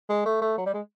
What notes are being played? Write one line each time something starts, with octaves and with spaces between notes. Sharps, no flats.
G#3
A3
A3
F#3
G3
G#3